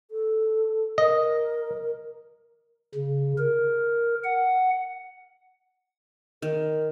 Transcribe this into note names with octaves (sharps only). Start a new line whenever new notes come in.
A4
A#4 D#5
C#3
A#4
F#5
D#3 A#4